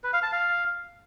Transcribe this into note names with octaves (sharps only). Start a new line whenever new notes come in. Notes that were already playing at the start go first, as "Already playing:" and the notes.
B4
F5
A5
F5